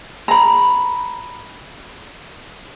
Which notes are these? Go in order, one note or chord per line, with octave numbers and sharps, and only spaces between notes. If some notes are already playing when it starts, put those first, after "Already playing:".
A#5 B5